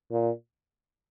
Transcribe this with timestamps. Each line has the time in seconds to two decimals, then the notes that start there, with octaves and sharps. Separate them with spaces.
0.11 A#2